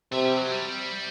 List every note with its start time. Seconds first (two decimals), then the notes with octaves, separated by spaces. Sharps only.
0.12 C3 A3
0.25 G3
0.37 F#3
0.52 G3